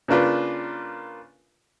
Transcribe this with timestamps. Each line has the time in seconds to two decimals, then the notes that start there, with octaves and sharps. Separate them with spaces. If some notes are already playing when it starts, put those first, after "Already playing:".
0.08 C#3 A#3 D4 F4 B4